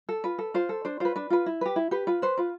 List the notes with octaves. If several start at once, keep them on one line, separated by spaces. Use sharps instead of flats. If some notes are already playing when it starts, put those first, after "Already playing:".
A4
F4 B4
A4
F4 C5
A4
D4 C5
F4 B4 C5
D4 B4
F4 B4
E4
G4 B4
E4
G4 B4
F4 B4
B4 C5
F4 B4